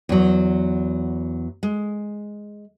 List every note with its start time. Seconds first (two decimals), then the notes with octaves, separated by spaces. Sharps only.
0.09 E2 F#3
1.63 G#3